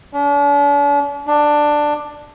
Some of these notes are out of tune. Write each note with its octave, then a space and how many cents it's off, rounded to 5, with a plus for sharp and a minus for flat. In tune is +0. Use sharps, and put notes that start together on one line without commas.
D4 -45
D4 +10